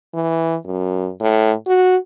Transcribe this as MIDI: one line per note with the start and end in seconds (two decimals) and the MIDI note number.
0.14 0.56 52
0.66 1.11 42
1.21 1.53 45
1.67 1.97 66